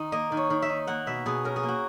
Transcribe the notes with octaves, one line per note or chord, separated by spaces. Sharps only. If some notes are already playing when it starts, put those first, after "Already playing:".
Already playing: D#3 D#4
A#3 D#5
D#3
C#5
D#3
E5
D#4
A#3 F#5
B2 E5
B2 G#4
C#4 A#4
G#4
A#3
F#4